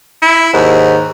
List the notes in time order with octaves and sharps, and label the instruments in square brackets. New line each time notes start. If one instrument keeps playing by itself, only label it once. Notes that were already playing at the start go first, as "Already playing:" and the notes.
[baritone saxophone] E4
[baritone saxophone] D#2 [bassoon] G#2